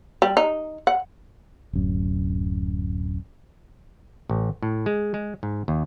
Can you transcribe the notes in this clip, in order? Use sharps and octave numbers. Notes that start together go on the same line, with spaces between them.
G3
D#4
F#5
D1 F#2
A1
A2
G#3
G#3
G#2
D#2